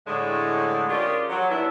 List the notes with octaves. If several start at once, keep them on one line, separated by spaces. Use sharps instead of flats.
A2 D3 G#3
C#4 F4 G4 G#4 A#4 D5
F#3
G2 B3 D4 E4